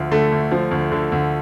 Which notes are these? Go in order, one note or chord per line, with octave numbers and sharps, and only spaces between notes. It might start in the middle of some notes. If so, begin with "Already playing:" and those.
Already playing: D2 F3
D3 A3
D2
F3
D2
D3
D2